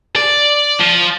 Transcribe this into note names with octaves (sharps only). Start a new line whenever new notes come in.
D5
F3